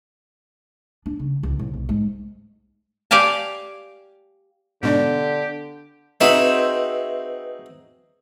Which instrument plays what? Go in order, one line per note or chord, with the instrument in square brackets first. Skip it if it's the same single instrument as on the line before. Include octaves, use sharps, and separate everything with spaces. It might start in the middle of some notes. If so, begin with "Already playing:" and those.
[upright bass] D4
C#3
C#2
C2
B1
G#2
[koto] G4 D5 F5 G#5 A5
[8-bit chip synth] G#2 B2 G#3 [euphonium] D3 [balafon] B3 D4 D5 [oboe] G4
[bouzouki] C4 E5 [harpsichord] D#4 F#4 G#4 [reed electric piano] B4 D#5